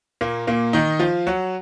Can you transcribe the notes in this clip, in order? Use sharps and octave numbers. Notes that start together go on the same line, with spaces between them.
A#2 A#3
A#2 A#3
D#3 D#4
F3 F4
F#3 F#4